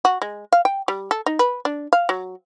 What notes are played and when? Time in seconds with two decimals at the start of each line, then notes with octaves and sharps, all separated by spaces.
0.05 F#4
0.22 G#3
0.53 F5
0.65 G5
0.88 G3
1.11 A4
1.26 D#4
1.39 B4
1.65 D4
1.93 F5
2.09 F#3